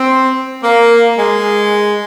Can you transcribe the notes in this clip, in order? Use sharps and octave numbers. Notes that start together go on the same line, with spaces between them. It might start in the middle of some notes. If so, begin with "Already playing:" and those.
Already playing: C4
A#3
G#3